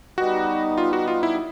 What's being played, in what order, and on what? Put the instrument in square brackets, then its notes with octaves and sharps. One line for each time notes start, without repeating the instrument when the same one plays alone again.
[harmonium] G3 B3 D#4 G4 [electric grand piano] F#4
[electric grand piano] F4
F#4
F4
E4